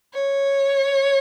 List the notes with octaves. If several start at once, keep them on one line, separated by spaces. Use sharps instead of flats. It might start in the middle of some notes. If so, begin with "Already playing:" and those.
C#5